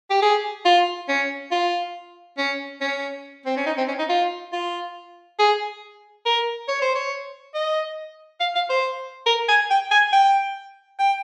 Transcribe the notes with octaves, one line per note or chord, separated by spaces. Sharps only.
G4
G#4
F4
C#4
F4
C#4
C#4
C4
C#4
D#4
C4
C#4
D#4
F4
F4
G#4
A#4
C#5
C5
C#5
D#5
F5
F5
C5
A#4
G#5
G5
G#5
G5
G5